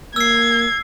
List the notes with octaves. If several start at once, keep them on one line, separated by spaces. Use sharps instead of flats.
A#3 E6 G#6 C7